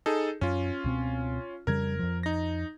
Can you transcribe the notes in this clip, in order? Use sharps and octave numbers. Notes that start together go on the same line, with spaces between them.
D#4 G#4 A4
F#2 C#4 F4
C#2 B2 C4
F2 C#3 G3 A#4 G#6
F2 F3
D#4 A#6